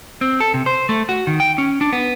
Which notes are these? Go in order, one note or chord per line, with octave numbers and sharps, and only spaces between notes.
C4
A4
C3
C5
A3
F#4
D#3
G5
C#4
D4
B3